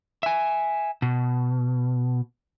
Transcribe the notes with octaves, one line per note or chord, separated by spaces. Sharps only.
E5 G#5
B2